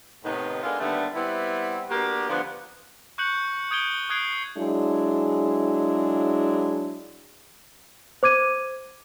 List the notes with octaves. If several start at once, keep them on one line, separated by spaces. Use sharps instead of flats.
A2 C3 D#3 B3 D#4
G#3 B3 D4 F4 A4 A#4
D#2 D3 G3 A3 B3
G3 B3 C4 E4
D3 A#3 B3 F#4 G4
D3 F3 B3
C#6 F#6 G6 C#7 F#7
D#6 G6 G#6 D7 D#7 G7
D#6 F#6 G#6 C7 D7
F#3 G#3 D4 E4 G#4
C5 D6 G#6 D#7